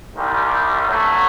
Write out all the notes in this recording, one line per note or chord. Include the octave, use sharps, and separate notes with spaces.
C2 C3 D#3 G3
G2 F#3 A3